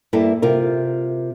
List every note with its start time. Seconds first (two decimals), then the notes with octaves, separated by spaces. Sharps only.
0.13 G2 A#3 E4 A4 E5
0.42 C3 F4 A#4